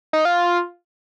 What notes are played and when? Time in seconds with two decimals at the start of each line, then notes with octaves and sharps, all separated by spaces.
0.13 D#4
0.25 F4